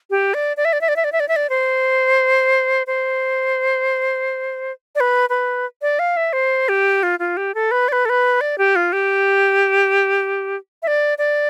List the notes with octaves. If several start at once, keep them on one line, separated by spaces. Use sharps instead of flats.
G4
D5
D5
E5
D5
E5
D5
E5
D5
E5
D5
E5
D5
C5
C5
D5
B4
B4
D5
F5
E5
C5
G4
F4
F4
G4
A4
B4
D5
B4
A4
B4
D5
G4
F4
G4
E5
D5
D5